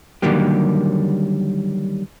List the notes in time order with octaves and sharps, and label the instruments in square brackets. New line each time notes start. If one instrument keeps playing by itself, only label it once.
[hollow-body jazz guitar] D3 D#3 F#3 G3 A#3 G4